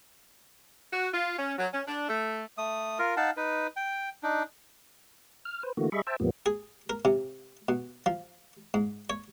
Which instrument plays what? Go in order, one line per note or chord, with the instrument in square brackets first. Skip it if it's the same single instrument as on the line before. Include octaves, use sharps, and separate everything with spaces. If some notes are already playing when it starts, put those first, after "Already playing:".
[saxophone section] F#4
F4
C#4
F#3
C#4
D4
A3
[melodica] A3 D#6
F4 A#4
D#4 F5 F#5 A5
D#4 B4
G5
D4 D#4
[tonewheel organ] F6
B4 C5
D3 E3 A3 A#3 F#4
G3 G#4 D#5 E5 B5 C#6
C5 E5 G5 A5
E2 A2 F3 G3 A#3 B3
[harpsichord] G#4
A#4
C3
B2
F3
G#2
C#5